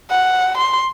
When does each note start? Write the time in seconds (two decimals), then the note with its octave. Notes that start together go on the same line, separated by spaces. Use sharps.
0.10 F#5
0.58 C6